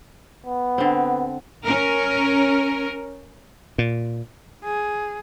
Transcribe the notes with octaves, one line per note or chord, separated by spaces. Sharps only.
B3
D3 C4
C#4 A#4
A#2
G#4